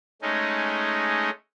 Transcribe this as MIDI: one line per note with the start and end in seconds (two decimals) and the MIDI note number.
0.22 1.30 56
0.22 1.30 57
0.22 1.30 61
0.22 1.30 63